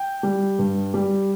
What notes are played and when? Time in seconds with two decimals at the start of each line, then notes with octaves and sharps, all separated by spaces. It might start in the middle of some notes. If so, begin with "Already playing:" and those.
Already playing: G5
0.23 G3
0.59 G2
0.94 G3